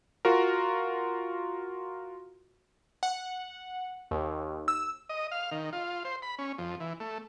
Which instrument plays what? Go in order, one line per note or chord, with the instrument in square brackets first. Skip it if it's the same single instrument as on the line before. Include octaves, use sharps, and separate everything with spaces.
[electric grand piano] F4 F#4 A#4
[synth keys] F#5
D#2
E6
[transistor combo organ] D#5
F5
D#3
F4
C5
B5
C#4
F2
E3
A3